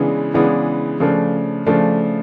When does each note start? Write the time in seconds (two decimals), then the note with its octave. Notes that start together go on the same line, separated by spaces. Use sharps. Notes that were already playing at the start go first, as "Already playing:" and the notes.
Already playing: C#3 E3 G#3 B3 D4
0.34 C#3 E3 G#3 B3 D4
1.00 C#3 F3 A3 D4
1.67 C#3 F3 A3 D4